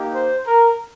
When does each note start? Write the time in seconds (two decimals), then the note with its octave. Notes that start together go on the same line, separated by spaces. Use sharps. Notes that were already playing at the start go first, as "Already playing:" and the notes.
Already playing: A#3 D#4 G4
0.13 C5
0.46 A#4